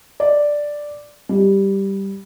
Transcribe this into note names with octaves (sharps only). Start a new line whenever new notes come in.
D5
G3